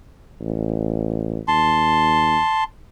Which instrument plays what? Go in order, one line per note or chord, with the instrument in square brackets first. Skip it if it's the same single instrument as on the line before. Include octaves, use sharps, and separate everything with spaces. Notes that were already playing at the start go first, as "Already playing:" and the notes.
[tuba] A1
[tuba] D#2 [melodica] A5 C6